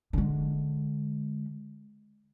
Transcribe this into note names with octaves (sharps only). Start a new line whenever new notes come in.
D3 G#3